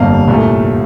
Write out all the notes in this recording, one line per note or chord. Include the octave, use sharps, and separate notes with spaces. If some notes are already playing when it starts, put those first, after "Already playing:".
Already playing: G1 F2 C3 G3 A#3 F5
C2 A#2 A3